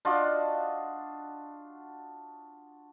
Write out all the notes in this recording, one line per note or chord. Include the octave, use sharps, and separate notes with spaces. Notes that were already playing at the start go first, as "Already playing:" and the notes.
D4 F4 F#4 D#5